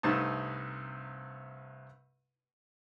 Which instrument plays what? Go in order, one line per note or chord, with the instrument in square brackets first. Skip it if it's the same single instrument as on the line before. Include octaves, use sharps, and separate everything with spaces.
[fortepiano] C2 G2 C3 A3 D#4 A5